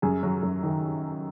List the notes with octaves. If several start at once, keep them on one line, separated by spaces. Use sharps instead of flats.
F#2 G#4 G#5
F#3
F#2
D#3